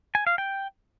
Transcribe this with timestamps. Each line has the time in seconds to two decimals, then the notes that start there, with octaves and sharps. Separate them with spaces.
0.15 G#5
0.27 F5
0.38 G5